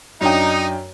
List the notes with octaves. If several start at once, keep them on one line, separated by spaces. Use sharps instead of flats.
F#2 D4 D#4 G5